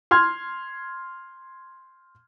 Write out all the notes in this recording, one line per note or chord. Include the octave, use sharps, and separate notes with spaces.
C6 F6 G#6